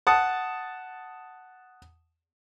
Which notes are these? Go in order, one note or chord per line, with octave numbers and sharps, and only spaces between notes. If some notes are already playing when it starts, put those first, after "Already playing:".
F#5 A5 D#6